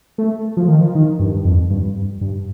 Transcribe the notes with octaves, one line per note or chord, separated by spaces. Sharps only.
A3
F3
D#3
F3
D#3
G2
F2
G2
G2